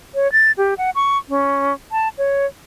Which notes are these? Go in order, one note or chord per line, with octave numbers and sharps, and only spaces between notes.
C#5
A6
G4
F#5
C#6
C#4
A5
C#5